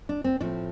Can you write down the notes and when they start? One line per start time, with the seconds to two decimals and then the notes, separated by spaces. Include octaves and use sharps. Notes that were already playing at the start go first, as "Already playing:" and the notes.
0.09 D4
0.24 C4
0.40 A2 F3 A3 C4 D4